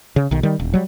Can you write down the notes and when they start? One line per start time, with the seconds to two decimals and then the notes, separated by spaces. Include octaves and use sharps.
0.16 C#3
0.31 B1 D#3
0.43 D#3 G3
0.60 D#1
0.74 F#3 G3